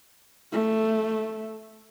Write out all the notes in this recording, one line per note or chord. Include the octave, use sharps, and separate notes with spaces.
A3